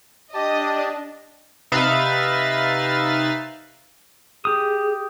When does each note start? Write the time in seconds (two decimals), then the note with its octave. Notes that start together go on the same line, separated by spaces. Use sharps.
0.34 D4 G4 D#5 A5
1.72 C3 D#4 B4 E5 F5 A6
4.45 G4 G#4 D#6